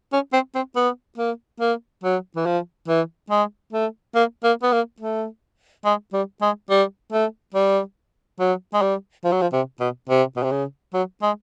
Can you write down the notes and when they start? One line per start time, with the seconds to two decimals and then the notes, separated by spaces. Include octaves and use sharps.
0.13 C#4
0.33 C4
0.55 C4
0.76 B3
1.18 A#3
1.60 A#3
2.04 F#3
2.36 E3
2.46 F3
2.88 E3
3.30 G#3
3.73 A3
4.15 A#3
4.44 A#3
4.63 B3
4.72 A#3
5.00 A3
5.85 G#3
6.13 G3
6.42 G#3
6.70 G3
7.12 A3
7.54 G3
8.40 F#3
8.74 G#3
8.82 G3
9.24 F3
9.32 F#3
9.42 F3
9.53 C3
9.80 B2
10.10 C3
10.36 B2
10.43 C3
10.51 C#3
10.94 F#3
11.22 G#3